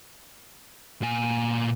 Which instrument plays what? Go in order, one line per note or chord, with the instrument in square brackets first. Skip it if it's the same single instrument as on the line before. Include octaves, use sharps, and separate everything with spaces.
[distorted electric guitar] A#2 G#5